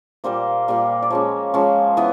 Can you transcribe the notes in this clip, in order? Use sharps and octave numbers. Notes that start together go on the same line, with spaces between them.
A#2 G3 A#3 C5
A#2 G3 A#3
D5
F3 G#3 C#4 C#5
F3 G#3 C#4
E3 B3